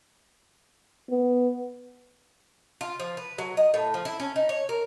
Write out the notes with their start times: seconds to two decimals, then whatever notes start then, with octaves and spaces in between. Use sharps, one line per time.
1.10 B3
2.81 F4
3.00 F3
3.17 B4
3.38 F#3
3.57 D#5
3.74 A2
3.94 F3
4.05 E4
4.20 C#4
4.36 D#4
4.49 C#5
4.69 A#4